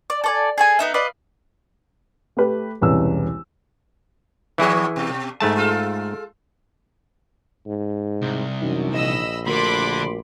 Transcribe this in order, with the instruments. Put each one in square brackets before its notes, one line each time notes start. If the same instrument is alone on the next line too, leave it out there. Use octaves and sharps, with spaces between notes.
[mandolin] D5
A4 D5 G#5
G#4 A4 G#5
B3 D#4 E5
F4 B4 D5 D#5
[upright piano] A3 G4 B4
E1 C2 E3 C#4 E6
[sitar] A2 F3 B3 [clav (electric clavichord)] E3 E4 G#4
[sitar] B2
[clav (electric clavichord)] G#2 A3 A5 [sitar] G#3
[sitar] G#3 F4 A4
[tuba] G#2
[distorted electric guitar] C2
[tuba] F#2 [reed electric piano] C3 E3 D#4
[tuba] A#1 [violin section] D#5 B5 E6
[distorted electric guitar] D3 [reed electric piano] A3 F#4 A#4 [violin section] B5 C6 D6